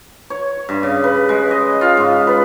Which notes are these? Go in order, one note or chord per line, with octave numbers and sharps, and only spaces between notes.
C#5
G2
C#3
B4
G#3
D#5
F4
G#2
B4